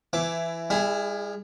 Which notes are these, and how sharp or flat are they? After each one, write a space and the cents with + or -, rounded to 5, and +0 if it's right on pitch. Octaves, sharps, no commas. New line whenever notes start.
E3 +20 E4 +10 D6 +0
G3 +45 E4 +20 G#4 +0